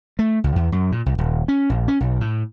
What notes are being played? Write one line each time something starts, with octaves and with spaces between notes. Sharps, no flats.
A3
C#2
E2
F#2
A#2
C2
D#1
C#4
A#1
C#4
B1
A2